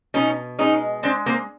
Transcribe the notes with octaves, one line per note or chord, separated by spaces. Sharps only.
B2 C#4 D#4
G#3 C#4 D#4
G#3 C4 D4
A#3 C4